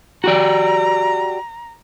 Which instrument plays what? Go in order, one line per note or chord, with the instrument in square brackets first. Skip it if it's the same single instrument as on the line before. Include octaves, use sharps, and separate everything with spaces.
[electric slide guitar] F#4 G4 D5 [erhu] A#5